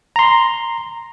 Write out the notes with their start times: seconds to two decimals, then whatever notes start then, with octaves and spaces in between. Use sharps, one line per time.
0.16 A#5 C6